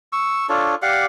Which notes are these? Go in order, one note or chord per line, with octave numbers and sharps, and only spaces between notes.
C#6 E6
D4 F4 A4 C#5
G4 D5 F5 F#5